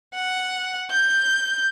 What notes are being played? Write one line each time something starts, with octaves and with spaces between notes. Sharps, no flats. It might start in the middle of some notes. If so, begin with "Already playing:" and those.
F#5
G6